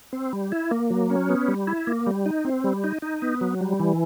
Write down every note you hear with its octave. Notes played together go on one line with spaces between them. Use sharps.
C4
G3
E4
A#3
F#3
C#4
B3
G3
E4
A#3
G3
D#4
C4
G3
D#4
D#4
B3
F#3
G3
E3